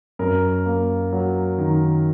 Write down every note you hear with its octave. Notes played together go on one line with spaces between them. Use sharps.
F#2 A#4
A#3
F#3
D#3